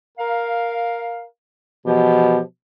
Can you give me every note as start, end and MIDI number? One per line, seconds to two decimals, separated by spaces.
0.18 1.25 70
0.18 1.25 77
1.86 2.39 47
1.86 2.41 52
1.86 2.41 53
1.86 2.41 67